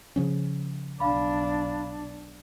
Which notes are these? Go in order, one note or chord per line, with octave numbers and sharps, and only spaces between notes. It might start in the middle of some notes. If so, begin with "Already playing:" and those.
C#3 F3 C#4
B1 D4 F5 B5